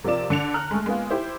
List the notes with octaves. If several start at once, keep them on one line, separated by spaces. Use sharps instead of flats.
C3 F3 A#4 D5 E7
D3 C#7 F7
A#5 F6 F#6
G#3 A3
G#3 A#3 B3 F4
E4 G4 C5